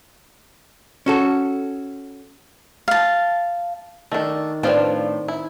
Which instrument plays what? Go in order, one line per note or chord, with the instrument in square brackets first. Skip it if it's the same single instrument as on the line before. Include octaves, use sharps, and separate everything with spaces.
[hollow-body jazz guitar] C#4 F#4 A4
[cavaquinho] F5 A5
[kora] D#3 A4 [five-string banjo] A3 D4
[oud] A2 D4 [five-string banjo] F3 F4 B4 [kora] C4
[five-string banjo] E4